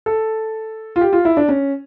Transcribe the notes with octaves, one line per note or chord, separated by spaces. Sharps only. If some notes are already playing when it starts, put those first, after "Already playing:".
A4
F4
G4
F4
E4
D4
C#4